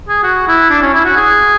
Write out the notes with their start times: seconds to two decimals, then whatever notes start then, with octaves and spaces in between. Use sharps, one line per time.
0.09 G#4
0.23 F#4
0.47 E4
0.70 D4
0.82 C#4
0.93 E4
1.05 F#4
1.16 G#4